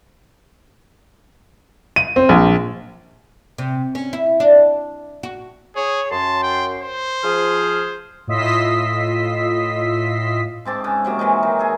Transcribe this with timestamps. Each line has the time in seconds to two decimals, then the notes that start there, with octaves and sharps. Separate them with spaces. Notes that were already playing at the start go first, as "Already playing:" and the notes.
1.96 D#7
2.16 C4
2.29 A#1
3.58 C3
3.95 C#4
4.13 E4
4.40 D4
5.23 F#4
5.76 G#4 C#5
6.11 F#2 A5 C6
6.43 G5
6.81 C5
7.24 F3 G#4 F6
8.27 A2 F4 D#5 E6 B6 C7
10.65 G#2 C4 A5 D6
10.84 C#3
11.04 C3 F#3 A#3
11.19 E3 F#3 G#3 D#4
11.43 D#3
11.59 G#4 A4